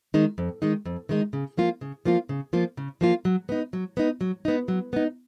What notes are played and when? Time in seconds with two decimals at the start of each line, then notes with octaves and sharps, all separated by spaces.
0.14 D#3 G#3 D#4
0.38 F2
0.62 D#3 G#3 D#4
0.85 F2
1.09 D#3 G#3 D#4
1.33 C#3
1.57 F3 A#3 F4
1.81 C#3
2.05 F3 A#3 F4
2.29 C#3
2.53 F3 A#3 F4
2.77 C#3
3.01 F3 A#3 F4
3.25 F#3
3.49 B3 D#4
3.73 F#3
3.97 B3 D#4
4.21 F#3
4.45 B3 D#4
4.68 F#3
4.93 B3 D#4